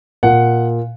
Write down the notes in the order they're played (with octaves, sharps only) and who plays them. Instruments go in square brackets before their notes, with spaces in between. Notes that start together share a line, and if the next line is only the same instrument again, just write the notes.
[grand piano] A#2 F#5